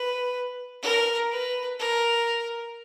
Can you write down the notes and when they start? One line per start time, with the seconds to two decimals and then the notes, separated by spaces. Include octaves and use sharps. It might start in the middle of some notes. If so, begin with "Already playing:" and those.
Already playing: B4
0.82 A#4
1.31 B4
1.79 A#4